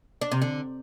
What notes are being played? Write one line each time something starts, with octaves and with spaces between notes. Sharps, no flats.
D4
C3
D3